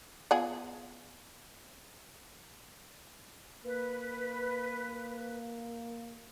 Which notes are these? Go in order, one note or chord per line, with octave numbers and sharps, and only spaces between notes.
B3 F4 G#4
A#3 B4